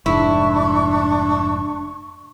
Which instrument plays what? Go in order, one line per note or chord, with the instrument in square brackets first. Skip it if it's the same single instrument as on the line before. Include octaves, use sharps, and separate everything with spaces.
[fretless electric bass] F1 G#2 [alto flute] D4 [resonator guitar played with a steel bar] E4 [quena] C#6